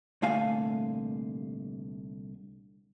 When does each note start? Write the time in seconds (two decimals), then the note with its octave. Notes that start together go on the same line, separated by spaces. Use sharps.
0.22 C2 A#2 D3 A3 F5 G#5